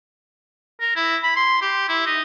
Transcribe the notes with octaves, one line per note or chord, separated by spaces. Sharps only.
A#4
E4
B5
C6
G4
E4
D#4